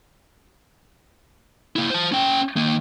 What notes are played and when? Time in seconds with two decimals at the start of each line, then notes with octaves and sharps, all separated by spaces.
1.76 A#3 E4
1.90 C5 A5
2.12 C#4 G5
2.56 D#3 A#3